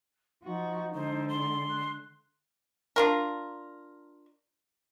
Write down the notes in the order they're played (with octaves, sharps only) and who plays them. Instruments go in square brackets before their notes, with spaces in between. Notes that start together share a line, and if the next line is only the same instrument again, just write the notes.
[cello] F3 F#4 [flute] D#4
[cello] D3 G#3 [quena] C5
[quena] C6
[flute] F#6
[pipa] D4 F4 A#4